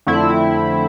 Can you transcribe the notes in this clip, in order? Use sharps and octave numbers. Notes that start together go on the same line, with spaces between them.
F2 D3 A3 C4 E4